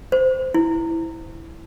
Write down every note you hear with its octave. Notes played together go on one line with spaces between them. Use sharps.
C5
E4